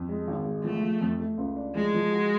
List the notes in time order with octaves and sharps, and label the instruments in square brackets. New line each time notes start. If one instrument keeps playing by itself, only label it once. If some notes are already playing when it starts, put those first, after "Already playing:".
Already playing: [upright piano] F2
G#3
G#1
G#3
[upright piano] F3 [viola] A3
[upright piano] F3
F2
A3
C#2
D4
[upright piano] F3 [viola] G#3
[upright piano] F3
F#4